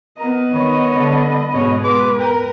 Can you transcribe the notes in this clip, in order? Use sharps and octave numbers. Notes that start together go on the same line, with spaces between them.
B3 A#4 D#5 A#5
D#3 C#5 B5
D3 G3
G#2 B2 G#4 C#5
B4 C6 D6
A#4 G5 A#5